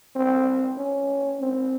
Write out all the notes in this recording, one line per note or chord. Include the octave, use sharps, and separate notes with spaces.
C4
C#4
C4